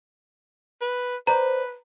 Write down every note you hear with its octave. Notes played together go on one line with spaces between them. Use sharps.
B4
B4 C5 D5 A#5